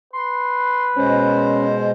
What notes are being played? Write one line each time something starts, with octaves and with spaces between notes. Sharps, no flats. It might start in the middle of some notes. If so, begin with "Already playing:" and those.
B4 C6
B2 G#3 C#4 C5